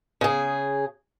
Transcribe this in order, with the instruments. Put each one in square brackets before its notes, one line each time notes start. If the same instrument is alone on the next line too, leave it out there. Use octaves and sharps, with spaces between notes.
[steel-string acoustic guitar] C#3 G#4